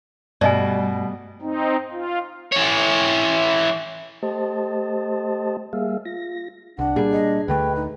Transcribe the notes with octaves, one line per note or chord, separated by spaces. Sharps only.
G2 B2 G3 A3 D5 D#5 G#5
C4 D#4
F4
E3 C#5
A3 G4 C5 D#5 A5
G3 A#3 G#4 E5 F5
F4 A#6
C2 D4 F#5
A#2 G3 G#4
D#5
D2 D3 A3 B4 G5
D#4